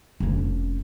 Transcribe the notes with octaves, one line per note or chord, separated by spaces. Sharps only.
F1 C#4